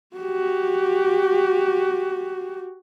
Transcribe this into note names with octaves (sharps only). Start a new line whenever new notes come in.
F#4 G4